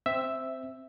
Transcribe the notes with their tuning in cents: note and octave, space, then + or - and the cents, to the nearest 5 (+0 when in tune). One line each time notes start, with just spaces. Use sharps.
C4 +0 E5 +0